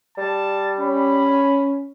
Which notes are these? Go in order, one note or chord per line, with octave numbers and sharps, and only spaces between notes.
G3 A5
C#4 B5